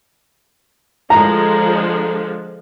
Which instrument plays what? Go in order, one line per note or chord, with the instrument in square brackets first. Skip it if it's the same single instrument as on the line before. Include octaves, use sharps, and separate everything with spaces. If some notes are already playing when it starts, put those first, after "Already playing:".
[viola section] D3 F3 G#3 [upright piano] A#5